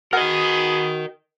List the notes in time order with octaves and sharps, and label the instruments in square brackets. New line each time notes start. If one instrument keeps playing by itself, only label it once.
[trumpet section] B3 G#4 [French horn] F#4 [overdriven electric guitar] A#4 D#5 [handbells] F#5 F6